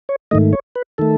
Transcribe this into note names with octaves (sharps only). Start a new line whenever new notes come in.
C#5
G#2 D#3 A3 D#5
C#5
B4
D#3 A3 A4